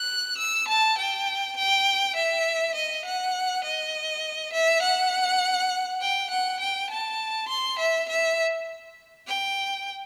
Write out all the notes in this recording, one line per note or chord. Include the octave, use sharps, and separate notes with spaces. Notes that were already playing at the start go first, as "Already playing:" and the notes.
Already playing: F#6
E6
A5
G5
G5
E5
D#5
F#5
D#5
E5
F#5
G5
F#5
G5
A5
C6
E5
E5
G5